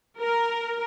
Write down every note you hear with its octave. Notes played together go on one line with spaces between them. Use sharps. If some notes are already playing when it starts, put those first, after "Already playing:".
A#4